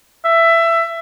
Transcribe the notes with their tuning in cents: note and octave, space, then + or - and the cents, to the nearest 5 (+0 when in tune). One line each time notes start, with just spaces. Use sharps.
E5 +15